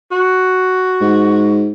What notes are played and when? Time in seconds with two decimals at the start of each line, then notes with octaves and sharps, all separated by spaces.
0.11 F#4
1.01 G#2